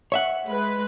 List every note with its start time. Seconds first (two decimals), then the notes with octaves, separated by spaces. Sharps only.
0.12 C#5 E5 F#5
0.48 G#3 B4